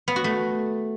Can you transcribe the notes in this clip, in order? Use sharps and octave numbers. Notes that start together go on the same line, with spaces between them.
B3
F#4
A3